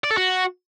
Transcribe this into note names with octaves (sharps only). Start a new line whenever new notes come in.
D5
A4
F#4